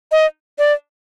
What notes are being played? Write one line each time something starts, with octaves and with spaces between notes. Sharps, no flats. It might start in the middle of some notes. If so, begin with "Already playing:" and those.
D#5
D5